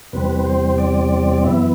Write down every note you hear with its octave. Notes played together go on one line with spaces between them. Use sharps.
E2 C3 G3 C4 B4
C5
D5
D5
F#2 E3 B3 E5